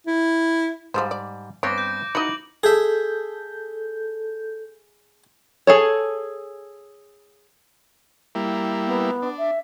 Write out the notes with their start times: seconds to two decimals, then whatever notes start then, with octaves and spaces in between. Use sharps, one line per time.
0.07 E4
0.94 G#2 F3 G3 G#3 C5
1.11 D5
1.63 G2 B3 C4 C#5 D6 A#6 D7
1.78 G6
2.15 D#4 E4 F#4 D#5 F#7
2.63 G#4 A4 E5 G6
5.67 G#4 A4 C#5
8.35 G3 A#3 E4
8.86 B3
9.22 D4
9.38 E5